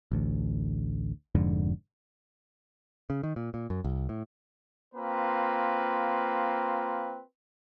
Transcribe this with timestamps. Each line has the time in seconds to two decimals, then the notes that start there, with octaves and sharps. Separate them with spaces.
0.12 A1 D2
1.35 F1 F2 G#2 D3
3.10 C#3
3.23 D#3
3.36 A#2
3.54 A#2
3.70 F#2
3.84 C2
4.09 A2
4.94 A#3 C4 F4 B4